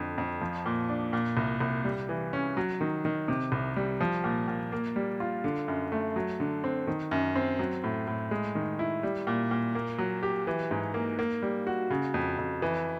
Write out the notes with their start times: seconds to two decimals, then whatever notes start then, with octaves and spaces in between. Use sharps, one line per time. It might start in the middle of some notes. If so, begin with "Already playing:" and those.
Already playing: F2 D3
0.18 F2
0.41 F3
0.66 A#2
0.89 D4
1.13 A#2
1.37 C2
1.61 C2
1.84 G3
2.09 E3
2.33 C#4
2.57 F#3
2.81 D#3
3.05 D#3
3.28 C3
3.52 C2
3.76 G3
4.01 F3
4.24 A#2
4.48 A#2
4.72 A#3
4.96 G3
5.20 F4
5.44 D3
5.68 F#2
5.92 A3
6.16 F#3
6.40 D3
6.64 C4
6.87 D#3
7.11 F#2
7.35 C4
7.59 F#3
7.84 A2
8.07 A2
8.31 G#3
8.55 D#3
8.79 E4
9.03 G3
9.27 A#2
9.51 A#2
9.75 A#3
9.98 F#3
10.23 G4
10.47 E3
10.71 G#2
10.94 A#3
11.19 A#3
11.42 G3
11.67 F#4
11.90 C#3
12.14 F2
12.38 F2
12.62 E3